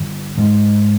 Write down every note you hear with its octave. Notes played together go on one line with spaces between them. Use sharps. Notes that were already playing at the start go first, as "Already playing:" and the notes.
Already playing: G2 D3
G#2